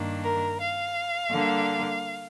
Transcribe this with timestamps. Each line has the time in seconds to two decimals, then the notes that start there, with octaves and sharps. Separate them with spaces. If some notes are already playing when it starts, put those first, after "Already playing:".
Already playing: G2 D#3 A#3 D4
0.23 A#4
0.59 F5
1.30 D3 G3 A#3 D4